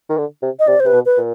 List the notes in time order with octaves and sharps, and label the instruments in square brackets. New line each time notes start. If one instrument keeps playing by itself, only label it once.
[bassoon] D#3
D3
C3
[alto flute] D#5
[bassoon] C3 [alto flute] D5
[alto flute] C5
[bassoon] C3 [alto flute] B4
[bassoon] B2
[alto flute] B4
[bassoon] A#2